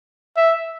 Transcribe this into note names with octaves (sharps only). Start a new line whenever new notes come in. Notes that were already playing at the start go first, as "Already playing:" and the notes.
E5